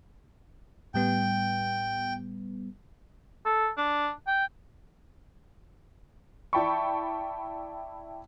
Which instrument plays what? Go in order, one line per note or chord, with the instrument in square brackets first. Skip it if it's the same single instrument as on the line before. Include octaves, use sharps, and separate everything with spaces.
[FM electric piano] A2 G3 B3 [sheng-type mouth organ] G5
[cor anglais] A4
D4
G5
[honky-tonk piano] E4 D5 G5 A5 B5 C#6